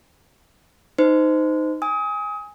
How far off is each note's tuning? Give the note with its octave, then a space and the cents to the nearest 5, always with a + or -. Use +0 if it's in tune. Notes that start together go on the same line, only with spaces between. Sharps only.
D#4 +0 C5 -30
G#5 -10 D#6 +30